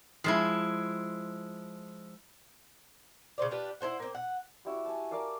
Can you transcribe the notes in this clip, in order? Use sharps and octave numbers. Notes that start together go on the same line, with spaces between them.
F3 G#3 E4
C#3 F4 C5 D5
D4 F4 G4 B4
E4 A4 C5 F#5
A#3 C4
F#5
G3 E4 F#4
G#5 A5
A#4 D5 F5 A5